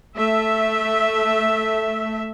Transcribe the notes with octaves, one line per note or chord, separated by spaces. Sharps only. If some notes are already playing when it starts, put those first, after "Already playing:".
A3 E5